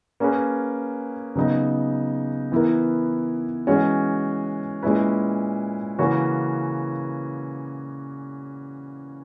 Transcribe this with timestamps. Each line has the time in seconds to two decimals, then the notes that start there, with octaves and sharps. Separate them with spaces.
0.20 A#3 C#4 G#4 B4
1.35 C#3 F#3 B3 D#4
2.52 E3 B3 E4 A#4
3.67 E3 G#3 C#4 F#4
4.83 A#2 G#3 C#4 E4 B4
5.99 C#3 E3 A#3 C#4 F#4